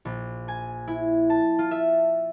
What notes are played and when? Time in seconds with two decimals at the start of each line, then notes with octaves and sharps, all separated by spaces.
0.05 A#1
0.48 G#5
0.87 E4
1.30 A5
1.59 F4
1.71 E5